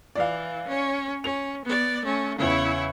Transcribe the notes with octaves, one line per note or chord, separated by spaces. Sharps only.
E3 D5 F5
C#4 C#5
C#4 F7
B3 D5
A3 C#4
E2 C#3 E4 C#5